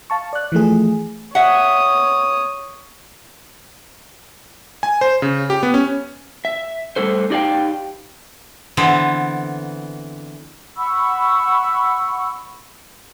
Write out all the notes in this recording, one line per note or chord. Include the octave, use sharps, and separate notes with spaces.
F5 A5 C#6
D5 F#6
E3 F3 A3 G#4
C#5 E5 F#5 D#6
G#5
C5
C#3
G4
B3
C#4
E5
G3 A3 A4 C5
D#4 G4 D5 D#5 F5 G5
D3 E3 B3 C4
F#5 B5 C#6 E6